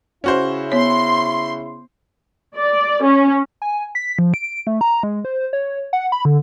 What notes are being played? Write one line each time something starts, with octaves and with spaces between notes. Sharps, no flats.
C#3 C#4 E4 F#4 C5
B3 C#5 C6
D5
C#4
G#5
B6
F3
D7
A3
A#5
G#3
C5
C#5
F#5
B5
D3